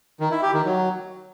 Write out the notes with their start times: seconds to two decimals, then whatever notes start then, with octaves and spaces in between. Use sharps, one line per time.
0.20 D#3
0.31 E4
0.42 G4
0.54 D#3
0.65 F#3